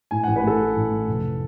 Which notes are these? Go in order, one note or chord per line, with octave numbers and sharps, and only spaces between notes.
A2 G#5
A1 F#5
B4
A2 A4
A1
A1
A2
F1